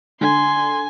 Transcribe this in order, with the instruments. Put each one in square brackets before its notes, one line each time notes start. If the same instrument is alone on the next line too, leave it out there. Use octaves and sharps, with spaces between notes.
[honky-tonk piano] D3 [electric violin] G#5 [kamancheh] C6